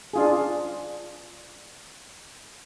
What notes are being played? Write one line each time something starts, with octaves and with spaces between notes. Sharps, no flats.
D4 F4 G#4